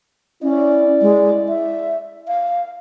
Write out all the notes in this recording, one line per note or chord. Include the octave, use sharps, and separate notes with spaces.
C#4 E4 D5
G#3
E5
F5